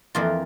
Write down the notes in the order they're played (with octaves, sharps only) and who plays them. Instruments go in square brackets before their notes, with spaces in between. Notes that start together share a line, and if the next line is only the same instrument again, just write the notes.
[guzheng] F2 E3 A#3 F4